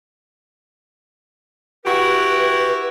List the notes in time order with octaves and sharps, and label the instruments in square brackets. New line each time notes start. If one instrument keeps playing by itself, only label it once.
[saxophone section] E4 F#4 G4 [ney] B4